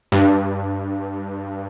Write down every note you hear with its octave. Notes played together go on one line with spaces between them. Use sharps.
G2